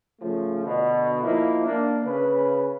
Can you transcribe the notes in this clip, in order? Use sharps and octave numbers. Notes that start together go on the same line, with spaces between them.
C#3 F3 A3
B2 D3
F3 A#3 D#4 E4
A#3 D4
C#3 B4